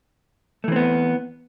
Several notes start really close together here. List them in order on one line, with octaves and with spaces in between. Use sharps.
A3 E3 C4 B3